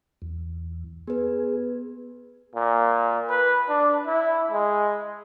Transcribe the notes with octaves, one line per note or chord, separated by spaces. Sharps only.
E2
B3 G#4 B4
A#2
B4
D4
E4
G#3